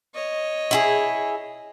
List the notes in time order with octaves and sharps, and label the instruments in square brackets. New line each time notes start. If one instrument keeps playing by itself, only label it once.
[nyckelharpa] C#5 D#5
[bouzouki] E4 F4 G#4